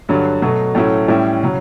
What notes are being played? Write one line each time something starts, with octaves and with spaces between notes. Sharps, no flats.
G2 D3 F#3
B2 F#3 A3
A2 F#3 A3 C#4 E4
A2 G3 C#4 E4
C#3 F#3